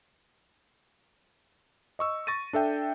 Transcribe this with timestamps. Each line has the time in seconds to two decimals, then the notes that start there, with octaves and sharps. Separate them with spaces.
1.99 D#5 C#6 E6
2.27 C#6 A6 A#6 D#7
2.53 D4 A4 E5 G5